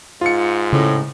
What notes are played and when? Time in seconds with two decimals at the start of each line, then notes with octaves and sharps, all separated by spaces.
0.21 G#2 F4 C#7
0.72 A2 C#3